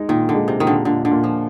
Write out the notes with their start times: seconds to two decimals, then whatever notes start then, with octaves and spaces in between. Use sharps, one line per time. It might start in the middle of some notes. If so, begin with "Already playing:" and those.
Already playing: G#3 D#4
0.09 A#2 D#3
0.29 D3
0.34 G#3
0.48 C3
0.60 A#2 D#3
0.67 D3
0.85 A#2 D3
1.05 D3
1.11 A#2
1.24 F3